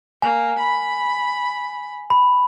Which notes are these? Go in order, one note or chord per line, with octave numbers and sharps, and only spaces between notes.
A#3 G#5
B5
B5